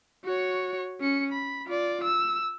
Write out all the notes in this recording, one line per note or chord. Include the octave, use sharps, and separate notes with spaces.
F#4 C#5
C#4 C#7
B5
F4 D5
E6